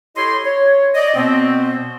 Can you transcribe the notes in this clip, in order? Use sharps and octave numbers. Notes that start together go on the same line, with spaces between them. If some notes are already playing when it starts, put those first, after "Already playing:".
E4 G4 A4 C#5 D#5 C6
C#5
D5 D#5
B2 B3 C4